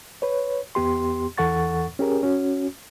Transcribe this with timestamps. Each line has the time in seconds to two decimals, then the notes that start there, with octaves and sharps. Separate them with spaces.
0.22 B4 C#5
0.75 E2 B3 G4 C6
1.37 E2 E3 A4 F#5 C#6 A6
1.99 C#4 G4 G#4 A#4
2.23 C#4 F#4